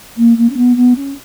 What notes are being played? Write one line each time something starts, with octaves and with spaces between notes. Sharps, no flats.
A#3
A#3
C#4
B3
B3
C#4